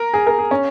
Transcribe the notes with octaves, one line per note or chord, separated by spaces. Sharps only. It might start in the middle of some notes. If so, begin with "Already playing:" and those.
Already playing: A#4
G#4
A#4
G#4
C#4